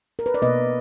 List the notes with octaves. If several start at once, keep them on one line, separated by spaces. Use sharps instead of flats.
A#4
B4
D5
B2 A#3 B4 D#5